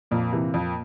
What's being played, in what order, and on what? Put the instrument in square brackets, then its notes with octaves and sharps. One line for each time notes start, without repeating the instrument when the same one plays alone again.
[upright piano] F2 [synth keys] A#2 A#3
[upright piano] C3 E3
F2